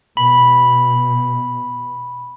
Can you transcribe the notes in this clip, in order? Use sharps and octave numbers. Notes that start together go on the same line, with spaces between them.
B2 B5